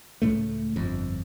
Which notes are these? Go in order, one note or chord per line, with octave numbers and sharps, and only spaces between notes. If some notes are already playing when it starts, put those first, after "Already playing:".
C#2 A2 A3
G1 F2